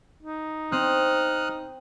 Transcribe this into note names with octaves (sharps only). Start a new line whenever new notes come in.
D#4
C4 D#6 F6 F#6